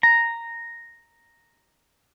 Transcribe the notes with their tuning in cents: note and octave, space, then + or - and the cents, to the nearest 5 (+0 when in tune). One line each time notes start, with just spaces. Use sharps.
A#5 -5